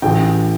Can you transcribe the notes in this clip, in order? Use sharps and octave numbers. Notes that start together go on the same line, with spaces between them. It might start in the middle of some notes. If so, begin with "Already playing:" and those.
A1 A2 E3 G5